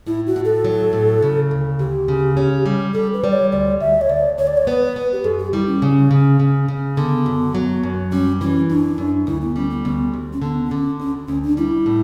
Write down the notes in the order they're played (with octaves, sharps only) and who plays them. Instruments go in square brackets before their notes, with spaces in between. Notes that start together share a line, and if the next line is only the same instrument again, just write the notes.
[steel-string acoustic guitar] A2 [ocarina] E4
[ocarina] F#4
[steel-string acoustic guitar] A2
[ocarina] A4
[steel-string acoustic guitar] F#3
A2
C#3
D2
[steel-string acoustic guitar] D2 [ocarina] G4
[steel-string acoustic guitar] C#3
C#4
G3
[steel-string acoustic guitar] G3 [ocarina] A4
[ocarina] B4
[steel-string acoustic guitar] G3 [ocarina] D5
[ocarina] C#5
[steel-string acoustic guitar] D2 [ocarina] D5
[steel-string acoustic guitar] D2 [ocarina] E5
[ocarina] C#5
[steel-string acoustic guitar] D2 [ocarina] D5
[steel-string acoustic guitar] D2 [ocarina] C#5
[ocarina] D5
C#5
[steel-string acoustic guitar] B3 [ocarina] B4
[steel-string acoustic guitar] B3
[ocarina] G4
[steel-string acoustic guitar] F#2 [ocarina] A4
[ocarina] G4
[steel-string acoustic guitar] G3 [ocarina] E4
[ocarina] C#4
[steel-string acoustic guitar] C#3
C#3
C#3
C#3
[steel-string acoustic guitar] D3 [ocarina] B3
[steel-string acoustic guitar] F#2
F#3
F#2
[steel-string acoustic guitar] G3 [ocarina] C#4
[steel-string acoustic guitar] E3 [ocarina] C#4
[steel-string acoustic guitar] F#2 [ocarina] D4
[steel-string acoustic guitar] F#2
[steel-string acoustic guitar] D2 [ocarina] E4
[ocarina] B3
[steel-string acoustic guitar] G3 [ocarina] C#4
[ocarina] B3
[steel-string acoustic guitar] D2 [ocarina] B3
[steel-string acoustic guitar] D2
[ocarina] C#4
[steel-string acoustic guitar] D3 [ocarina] B3
[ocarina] B3
[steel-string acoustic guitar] D3 [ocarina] C#4
[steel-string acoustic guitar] D2 [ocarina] C#4
[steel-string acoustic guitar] D2 [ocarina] C#4
[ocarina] D4
[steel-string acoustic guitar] G3 [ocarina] E4
[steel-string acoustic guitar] A2